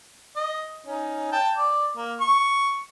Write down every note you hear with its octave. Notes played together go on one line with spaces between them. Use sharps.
D#5
C#4 D#4
G5 A5
D5
A#3
C#6